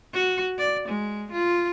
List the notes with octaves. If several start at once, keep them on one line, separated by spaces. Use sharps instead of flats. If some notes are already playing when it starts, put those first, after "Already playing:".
F#4
D5
G#3
F4